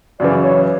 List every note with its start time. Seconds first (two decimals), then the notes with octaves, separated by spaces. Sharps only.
0.19 F#2 C#3 E3 D5
0.43 C#5